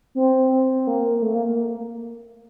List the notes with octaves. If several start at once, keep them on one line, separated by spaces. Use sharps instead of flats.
C4
C4
A#3
A#3
A3
A#3
A#3
A#3